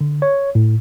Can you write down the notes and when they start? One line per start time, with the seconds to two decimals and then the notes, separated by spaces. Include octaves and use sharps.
0.01 D3
0.22 C#5
0.55 A2